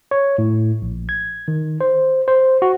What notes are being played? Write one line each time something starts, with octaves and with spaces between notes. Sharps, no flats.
C#5
A2
A#1
G#6
D#3
C5
C5
F#4